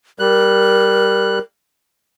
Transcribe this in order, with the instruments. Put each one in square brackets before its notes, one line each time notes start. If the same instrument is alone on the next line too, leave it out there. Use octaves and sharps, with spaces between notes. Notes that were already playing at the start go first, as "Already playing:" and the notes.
[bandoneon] G3 F#6 [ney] A#4